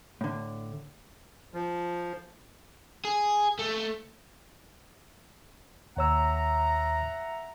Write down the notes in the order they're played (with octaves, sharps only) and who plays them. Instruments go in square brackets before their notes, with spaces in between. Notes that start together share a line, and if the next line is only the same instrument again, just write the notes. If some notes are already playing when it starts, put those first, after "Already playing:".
[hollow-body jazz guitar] A2 D3
[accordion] F3
[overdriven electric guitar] G#4
A3
[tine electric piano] D#2 C#5 E6 [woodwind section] E5 F#5 A#5